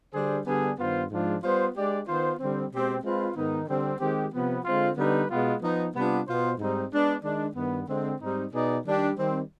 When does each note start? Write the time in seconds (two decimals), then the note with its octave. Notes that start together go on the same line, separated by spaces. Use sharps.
0.13 D3 G3 D4 G#4 C5
0.45 D3 G3 B3 D4 G#4
0.78 G2 D#3 B3 F4 C5
1.10 G#2 F3 G#3 D4 F4
1.42 G3 B3 F4 C5
1.75 G#3 D4 G4 D5
2.06 D#3 B3 F4 C5
2.40 D3 G3 C4
2.71 B2 G#3 C4 G4
3.03 G#3 C4 F4 B4
3.36 G#2 D#3 B3 D#4
3.68 D3 G3 C4
4.00 D#3 G#3 C4 G4
4.32 C3 F3 B3
4.64 D3 G#3 C4 F4
4.97 D3 G3 B3 D#4 B4
5.29 B2 G#3 B3 F4
5.61 F3 B3 D#4
5.93 C3 G3 B3 D4 F4
6.26 B2 B3 F4 C5
6.58 G#2 G3 C4 D#4
6.90 G#3 B3 D4
7.22 D#3 G#3 D4
7.55 G2 D#3 B3
7.87 D3 G#3 C4
8.19 G#2 G3 C4 D#4
8.52 B2 B3 D#4 G#4 D5
8.83 D#3 G3 D4 G4
9.16 D#3 G3 C4